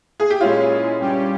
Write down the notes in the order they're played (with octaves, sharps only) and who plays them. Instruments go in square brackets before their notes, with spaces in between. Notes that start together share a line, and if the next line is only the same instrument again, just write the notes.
[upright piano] G#4
G4
[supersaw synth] A#2 G#3 E4 G#4 [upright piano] C#4 F4
[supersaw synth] G2 G3 C#4 G4